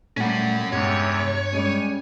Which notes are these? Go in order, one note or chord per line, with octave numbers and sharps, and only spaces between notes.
A#2 G3 A3 C#4 F#5
E2 G2 C3 G#3 G4 C#5
G3 G#3 C#4 G#5